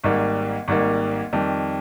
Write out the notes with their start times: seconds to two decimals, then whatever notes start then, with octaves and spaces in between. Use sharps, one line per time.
0.04 G#1 G#2 G3 A#3
0.68 G#1 G#2 G3 A#3
1.33 F2 D#3 G3